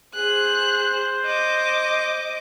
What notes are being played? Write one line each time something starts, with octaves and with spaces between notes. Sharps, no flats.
G#4 C5 F#6
D#5 D6